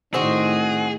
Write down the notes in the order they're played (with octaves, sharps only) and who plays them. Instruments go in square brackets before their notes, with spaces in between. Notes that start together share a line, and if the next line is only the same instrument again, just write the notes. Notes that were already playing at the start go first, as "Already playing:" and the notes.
[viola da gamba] A2 D#3 [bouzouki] C4 F#4 [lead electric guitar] G#4